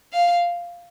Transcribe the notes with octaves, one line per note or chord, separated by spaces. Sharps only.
F5